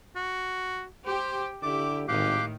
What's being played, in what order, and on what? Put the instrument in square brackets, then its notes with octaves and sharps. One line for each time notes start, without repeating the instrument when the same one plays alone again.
[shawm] F#4
[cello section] G4 [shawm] C5
[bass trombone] D3 [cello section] E4 G4 [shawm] D6
[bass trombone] G#1 [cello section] A2 D#3 [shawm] G4 [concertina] F5 D6 F#6